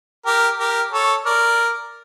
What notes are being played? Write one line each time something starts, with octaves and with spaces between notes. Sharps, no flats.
G4 A#4
G4 A#4
A4 C#5
A#4 D5